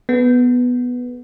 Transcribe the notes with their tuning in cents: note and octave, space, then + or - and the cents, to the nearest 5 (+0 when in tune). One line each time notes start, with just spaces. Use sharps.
B3 +0 A4 -25